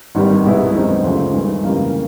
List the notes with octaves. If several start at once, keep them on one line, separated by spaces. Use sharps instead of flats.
G#1 G2 D#3 G3
C2 B2 G#3 B3 E4
F#2 D#3 G3 C4 D#4
D2 C#3 F3 G#3
G2 D#3 G#3
F2 C#3 E3 G3 A#3